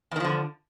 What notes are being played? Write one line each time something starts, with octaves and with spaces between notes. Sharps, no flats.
E2 D3 D#3 F3